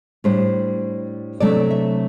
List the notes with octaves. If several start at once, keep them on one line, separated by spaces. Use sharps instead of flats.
A2 G3 D4 C5
C3 F#3 A3 D4 D5
E5